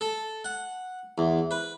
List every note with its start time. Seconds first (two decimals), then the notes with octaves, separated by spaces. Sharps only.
0.01 A4
0.45 F#5
1.18 E2
1.51 B4